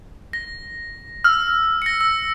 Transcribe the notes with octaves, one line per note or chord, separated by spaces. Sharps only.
A#6
E6 F6
A#6 C#7
E6